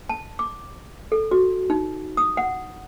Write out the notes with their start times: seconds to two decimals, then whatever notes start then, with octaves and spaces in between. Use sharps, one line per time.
0.09 A5
0.39 D6
1.12 A4
1.31 F#4
1.70 D#4
2.17 D#6
2.37 F#5